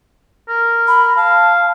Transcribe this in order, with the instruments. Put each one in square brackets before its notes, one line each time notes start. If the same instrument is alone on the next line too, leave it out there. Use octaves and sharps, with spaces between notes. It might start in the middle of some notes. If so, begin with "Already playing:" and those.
[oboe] A#4
[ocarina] B5
[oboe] F5 [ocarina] A5